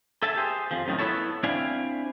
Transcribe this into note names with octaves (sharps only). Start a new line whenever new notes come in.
A4 E5 G#5 A5
G4 G#4 C5
F2 F3
F#2 A2 D#3
B3 E4 A4 C#5 A5
C4 D4 E4 D5 F5 G#5